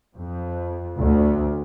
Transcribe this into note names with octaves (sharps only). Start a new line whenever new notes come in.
F2
D2